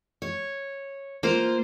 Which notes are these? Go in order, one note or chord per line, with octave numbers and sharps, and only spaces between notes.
C#5
A#3 F4 C5